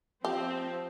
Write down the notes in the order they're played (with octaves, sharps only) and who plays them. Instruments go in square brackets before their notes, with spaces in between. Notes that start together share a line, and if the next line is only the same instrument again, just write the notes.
[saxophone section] F3 [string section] C4 [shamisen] G4